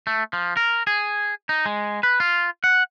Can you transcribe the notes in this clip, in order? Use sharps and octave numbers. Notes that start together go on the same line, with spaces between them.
A3
F3
A#4
G#4
D#4
G#3
B4
F4
F#5